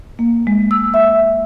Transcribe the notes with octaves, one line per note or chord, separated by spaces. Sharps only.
A#3
G#3
E6
E5